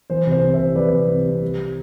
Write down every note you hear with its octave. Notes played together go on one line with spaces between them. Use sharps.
E3 C5
C2
C5
C3
C5 E5
C2
E3 B4 D5
C2
C3
C2
G3